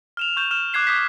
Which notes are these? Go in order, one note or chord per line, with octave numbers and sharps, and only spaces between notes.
F6 E7 F7
C#6 G6 E7
F6 E7
D6 F#6 G#6 C7 E7
D6 D#6 G6 B6